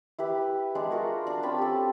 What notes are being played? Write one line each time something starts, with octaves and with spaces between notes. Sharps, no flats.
E4 G4 B4
G#3 D4 F#5
F4 F#4 A#4
D4
C4 C#4 A5 B5
G4 A4